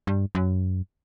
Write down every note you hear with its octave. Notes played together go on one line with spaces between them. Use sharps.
G2
F#2